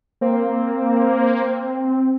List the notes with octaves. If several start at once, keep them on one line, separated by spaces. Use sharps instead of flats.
A#3 C4